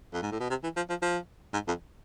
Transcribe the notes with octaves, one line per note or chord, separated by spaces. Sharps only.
F2
G#2
A2
B2
C3
E3
F3
F3
F3
G#2
F2